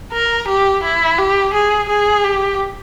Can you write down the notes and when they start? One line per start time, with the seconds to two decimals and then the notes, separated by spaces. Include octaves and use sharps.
0.13 A#4
0.48 G4
0.84 E4
1.19 G4
1.54 G#4
1.89 G#4
2.24 G4